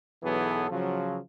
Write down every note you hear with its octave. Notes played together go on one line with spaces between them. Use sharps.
B1 E3 F#3 B3 G#4 A4
C#3 F3 F#3